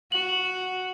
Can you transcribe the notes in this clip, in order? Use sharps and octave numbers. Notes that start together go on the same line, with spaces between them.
F#4 F#7